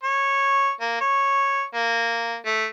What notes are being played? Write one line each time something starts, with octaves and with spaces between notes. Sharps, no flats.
C#5
A#3
C#5
A#3
A3